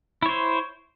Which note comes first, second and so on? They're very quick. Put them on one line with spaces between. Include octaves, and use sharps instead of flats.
E4 C#5 C5